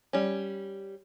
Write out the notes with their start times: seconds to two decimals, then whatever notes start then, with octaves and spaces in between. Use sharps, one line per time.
0.13 G3 C#4